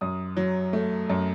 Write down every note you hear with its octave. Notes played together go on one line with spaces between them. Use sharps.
F#2 D#6
F#3
A3
F#2